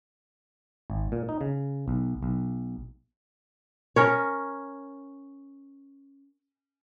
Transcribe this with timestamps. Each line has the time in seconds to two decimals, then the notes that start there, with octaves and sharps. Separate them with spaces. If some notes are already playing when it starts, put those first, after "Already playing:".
0.90 G#1
1.12 A#2
1.29 D#4
1.41 C#3
1.88 B1
2.23 B1
3.96 C#4 A#4 C#5